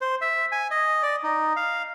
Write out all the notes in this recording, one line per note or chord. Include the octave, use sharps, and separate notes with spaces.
C5
E5
G#5
D#5
D5
D#4
F5